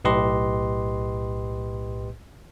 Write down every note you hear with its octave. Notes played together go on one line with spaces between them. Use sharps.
B1 A2 G4 B4 D#5 C6